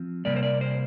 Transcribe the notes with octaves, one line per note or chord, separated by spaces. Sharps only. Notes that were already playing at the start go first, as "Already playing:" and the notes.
Already playing: F3 C4
C3 G3 A#3 D5
C5
D5
C5